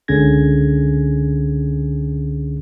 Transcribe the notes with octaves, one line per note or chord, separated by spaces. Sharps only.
C#2 D3 C#4 G#4 G#6 A#6